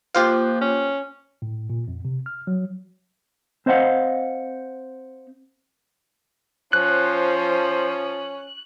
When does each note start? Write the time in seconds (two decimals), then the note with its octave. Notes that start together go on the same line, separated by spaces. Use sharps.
0.15 F3 A#3 F4 G4 C5 F5 F#6
0.61 C#4
1.42 A2
1.70 A#2
1.88 F2
2.05 C3
2.26 F6
2.47 F#3
3.66 C4 C5 D#5 F5 F#5
6.73 F3 C#4 C5 F#6